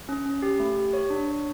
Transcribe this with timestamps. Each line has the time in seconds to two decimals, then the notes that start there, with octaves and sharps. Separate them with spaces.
0.09 C#4
0.26 C#4
0.42 G4
0.60 A3
0.76 G4
0.93 C#5
1.10 D4
1.28 C#5